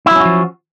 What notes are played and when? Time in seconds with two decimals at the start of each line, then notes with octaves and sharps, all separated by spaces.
0.06 E4
0.11 F#3
0.16 C#4
0.20 F#4
0.25 F3